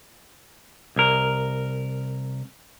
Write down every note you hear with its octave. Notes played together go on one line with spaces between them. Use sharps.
C2 A#4